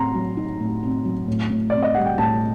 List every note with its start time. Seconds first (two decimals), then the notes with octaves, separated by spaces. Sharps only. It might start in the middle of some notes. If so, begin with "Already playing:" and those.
Already playing: A2 C4 A#5 C6
0.14 F#3
0.37 D#4
0.60 A2
0.83 C4
1.05 F#3
1.28 A2
1.50 A2
1.70 C4 D5
1.83 D#5
1.94 G3 F#5
2.06 G5
2.18 A2 A5